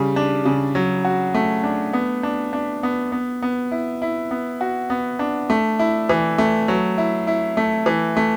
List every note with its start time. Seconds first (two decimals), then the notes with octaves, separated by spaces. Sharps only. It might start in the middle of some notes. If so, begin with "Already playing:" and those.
Already playing: C#3 G3
0.16 D4
0.45 C#3
0.75 F#3
1.05 F#4
1.35 A3
1.64 D4
1.93 B3
2.23 D4
2.53 D4
2.83 B3
3.12 B3
3.42 B3
3.72 E4
4.02 E4
4.31 B3
4.61 F#4
4.90 B3
5.19 D4
5.50 A3
5.79 E4
6.09 E3
6.38 A3
6.68 F#3
6.98 E4
7.27 E4
7.57 A3
7.86 E3
8.17 A3